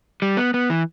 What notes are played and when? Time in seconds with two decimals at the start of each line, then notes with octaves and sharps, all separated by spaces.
0.22 G3
0.37 B3
0.54 B3
0.70 E3